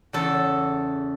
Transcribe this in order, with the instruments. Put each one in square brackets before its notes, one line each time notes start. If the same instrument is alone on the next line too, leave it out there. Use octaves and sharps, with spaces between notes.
[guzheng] E2 C#3 E3 A4